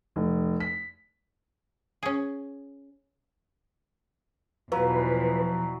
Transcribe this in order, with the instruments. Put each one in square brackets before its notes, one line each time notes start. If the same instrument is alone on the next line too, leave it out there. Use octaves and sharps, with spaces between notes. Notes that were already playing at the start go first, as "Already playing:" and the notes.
[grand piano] F1
B6
[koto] C#4 G#4
[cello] E2 B2 [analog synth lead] F3 [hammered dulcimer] F#3 [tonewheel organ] B4